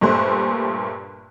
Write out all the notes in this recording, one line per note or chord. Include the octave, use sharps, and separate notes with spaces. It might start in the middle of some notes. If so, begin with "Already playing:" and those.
G2 A#2 G3 A3 C5 F#6